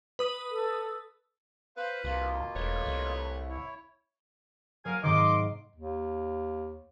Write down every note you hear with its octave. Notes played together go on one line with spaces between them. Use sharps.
B4 D#6
A4
B4 C5 F5
C2 B2 A#3 F4
E1 A3 B4 C#5
C2
E4 C#5
F#3 A#3 A#4 F5 G#5
G#2 C3 D#3 D#5 C6 D6
D#2